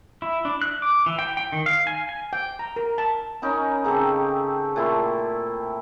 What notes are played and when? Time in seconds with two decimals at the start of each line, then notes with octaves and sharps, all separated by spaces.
0.22 E4
0.45 D4
0.62 F#6
0.82 D6
1.06 E3
1.19 G5
1.37 G5
1.52 D#3
1.66 F5
1.87 G#5
2.09 G#5
2.33 G5
2.59 A#5
2.76 A#4
2.98 A5
3.42 C#4 D#4 A#4 B5
3.84 C#3 C4 G4 A4
4.76 A#2 A3 E4 C6